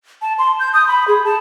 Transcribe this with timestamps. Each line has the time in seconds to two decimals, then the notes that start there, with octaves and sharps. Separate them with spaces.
0.22 A5
0.38 C6
0.60 G6
0.74 D#6
0.88 B5
1.08 G#4
1.25 A5